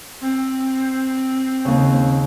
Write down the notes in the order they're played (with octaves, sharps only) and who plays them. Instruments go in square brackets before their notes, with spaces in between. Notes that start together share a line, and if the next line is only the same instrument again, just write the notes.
[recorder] C4
[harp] D#2 C#3